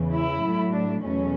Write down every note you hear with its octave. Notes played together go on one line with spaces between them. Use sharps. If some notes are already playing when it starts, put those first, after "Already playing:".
Already playing: E2 C#3 E3
E4
A2 F#3 A3
D4
E2 B2 F#3 A3 C#4